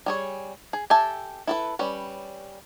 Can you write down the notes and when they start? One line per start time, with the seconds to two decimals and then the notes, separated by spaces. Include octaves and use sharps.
0.06 G3 G#4 C#5
0.73 G#4
0.90 G4 A4 E5 G#5 A5
1.47 E4 A4 B4
1.79 G3 C#4 B4